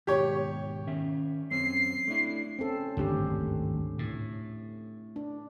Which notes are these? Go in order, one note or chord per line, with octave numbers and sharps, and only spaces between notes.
D#2 G#2 B2 G4 C#5
D#3 C#4 E5
F#2 C4 C#4 C7
A3 D4 E4
C4 C#4 A4
G#1 D2 G2 D3 G4
A2
D4